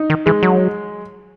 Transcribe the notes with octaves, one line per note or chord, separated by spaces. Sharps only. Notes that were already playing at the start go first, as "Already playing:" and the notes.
Already playing: D#4
D#3
E3 G#3
F#3